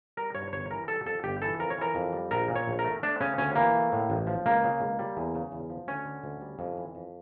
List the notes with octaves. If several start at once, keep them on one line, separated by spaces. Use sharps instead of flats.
G3 A#4
G2 C#5
G1 C#5
E3 A#4
G3 A4
F2 A4
G1 G4
E3 A4
F2 A#4
C#5
E3 A#4
F2
G3
A#1 A#4
A#2
C#5
A#1
A#4
A3
A3 D4
C#3 C#4
D2 C#4
E3 A#3
A3
A2
A1
F3
C#2 A#3
C#3
C#2
G3
E2
C#3
E2
F3
D2 C#4
D3
D2
G3
F2
E3
F2